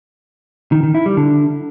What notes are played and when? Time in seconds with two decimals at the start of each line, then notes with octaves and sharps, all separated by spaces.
0.72 D#3
0.83 D#3
0.95 E4
1.06 G3
1.17 D3